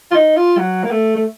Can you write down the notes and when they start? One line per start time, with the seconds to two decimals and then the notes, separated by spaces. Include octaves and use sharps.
0.11 F4
0.15 D#4
0.37 F4
0.58 F#3
0.84 A#3
0.91 A3
1.15 A3